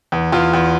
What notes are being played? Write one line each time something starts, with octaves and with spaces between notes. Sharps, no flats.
E2
E2 F4
E2